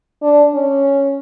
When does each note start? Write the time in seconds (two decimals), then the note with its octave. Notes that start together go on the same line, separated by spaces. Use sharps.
0.22 D4
0.54 C#4